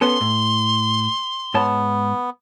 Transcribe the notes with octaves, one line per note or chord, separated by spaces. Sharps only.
B3 C#4 A4 C6 G7
A2
G#2 B3 C#5 A5